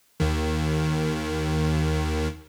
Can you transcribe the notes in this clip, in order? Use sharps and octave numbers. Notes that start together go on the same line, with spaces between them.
D#2 D#3